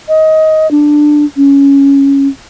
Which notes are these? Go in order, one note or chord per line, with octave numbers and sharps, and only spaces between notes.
D#5
D4
C#4